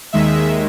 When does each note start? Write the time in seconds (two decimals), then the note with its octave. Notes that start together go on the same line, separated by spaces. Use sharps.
0.13 D#2 D#3 G#3 E5